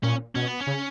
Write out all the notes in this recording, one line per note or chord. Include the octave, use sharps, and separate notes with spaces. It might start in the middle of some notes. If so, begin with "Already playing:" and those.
A#2 C#4
B2 C#4
B3
C#4
C#3